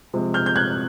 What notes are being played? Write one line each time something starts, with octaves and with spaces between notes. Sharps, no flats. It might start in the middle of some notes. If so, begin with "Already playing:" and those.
C3 F3 G#3
F6 G6
G6
F#6 G#6